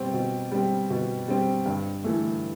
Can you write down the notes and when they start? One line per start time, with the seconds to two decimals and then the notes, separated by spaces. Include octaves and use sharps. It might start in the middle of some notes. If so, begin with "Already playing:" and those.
Already playing: B2 G3 C4
0.13 B2
0.52 G3 C4
0.90 B2
1.28 G3 C4
1.66 G2
2.04 E3 A3